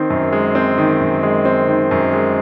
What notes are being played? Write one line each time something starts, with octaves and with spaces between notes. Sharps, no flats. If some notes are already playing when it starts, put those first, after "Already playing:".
Already playing: D#3 C4
F#2
G#3
C4
D#3
F#2
G#3
C4
D#3
F#2
G#3